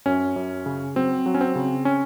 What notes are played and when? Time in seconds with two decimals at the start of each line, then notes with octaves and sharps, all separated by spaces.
0.06 F#2 C#4
0.36 F#2
0.66 C#3
0.95 F#3 C4
1.26 F#3
1.34 C#4
1.41 C4
1.55 C#3
1.85 C#4